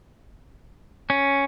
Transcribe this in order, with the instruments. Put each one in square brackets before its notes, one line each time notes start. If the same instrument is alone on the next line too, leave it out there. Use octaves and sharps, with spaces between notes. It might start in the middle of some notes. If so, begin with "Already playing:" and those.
[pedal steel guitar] C#4